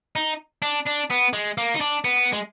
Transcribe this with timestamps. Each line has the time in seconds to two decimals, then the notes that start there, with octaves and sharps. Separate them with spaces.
0.16 D#4
0.62 D4
0.87 D4
1.11 B3
1.33 G#3
1.58 A#3
1.74 D#4
1.81 D4
2.05 B3
2.32 G#3